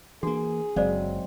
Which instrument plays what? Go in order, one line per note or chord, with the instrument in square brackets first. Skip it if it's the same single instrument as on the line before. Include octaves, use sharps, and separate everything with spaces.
[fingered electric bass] E3 A#3 [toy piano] D4 F#4 [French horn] G#4
[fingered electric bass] F#1 [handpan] F#3 G#3 C4 [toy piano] C5 D5 F5